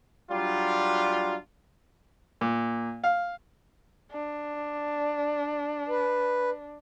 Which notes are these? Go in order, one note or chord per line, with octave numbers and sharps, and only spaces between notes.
F#3 G3 D4 F4
A#2
F5
D4
B4